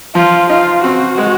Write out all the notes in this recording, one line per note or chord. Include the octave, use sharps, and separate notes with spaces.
F3 F4
D#4 F4
C4 F#4
G#3